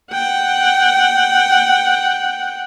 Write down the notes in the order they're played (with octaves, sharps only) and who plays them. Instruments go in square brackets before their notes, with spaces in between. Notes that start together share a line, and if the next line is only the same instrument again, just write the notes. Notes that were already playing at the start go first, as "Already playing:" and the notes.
[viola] F#5 G5